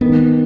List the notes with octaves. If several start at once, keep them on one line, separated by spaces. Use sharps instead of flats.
D#3 B3